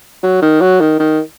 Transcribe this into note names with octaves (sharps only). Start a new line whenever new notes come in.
F#3
D#3
F#3
D#3
D#3